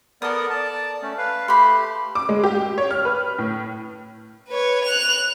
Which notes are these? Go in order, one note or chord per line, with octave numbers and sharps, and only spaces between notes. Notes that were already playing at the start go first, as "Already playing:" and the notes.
B3 A4 A#4 D5 D#6
D5 A5
A3 C#4
B4 F5
A3 G4 B5 C6
D6
G#3
G4
C#5
F6
B4
A2
B4 C#5
F#6 F7